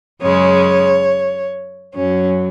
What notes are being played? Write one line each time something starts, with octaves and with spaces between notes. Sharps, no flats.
F#2 C#3 G#3 C#5
F#2 F#3 C#4